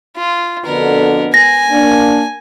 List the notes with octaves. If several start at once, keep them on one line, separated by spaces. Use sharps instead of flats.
F4
F2 B2 D3 B3 A#4
G#5 A#6
A#3 D4